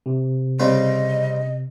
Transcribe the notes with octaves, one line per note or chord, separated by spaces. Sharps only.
C3
C#3 G3 C4 D#5